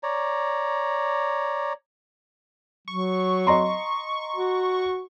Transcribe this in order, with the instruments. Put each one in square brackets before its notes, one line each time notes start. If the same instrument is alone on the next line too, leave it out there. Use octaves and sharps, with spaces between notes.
[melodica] C#5 D5 A#5
[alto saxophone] F#3 [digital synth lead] C#6
[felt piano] D#5 A#5 C6
[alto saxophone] F#4